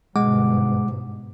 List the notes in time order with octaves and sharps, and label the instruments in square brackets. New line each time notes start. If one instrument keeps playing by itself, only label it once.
[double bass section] G1 G#2 B2 [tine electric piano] G#3 F#5 D6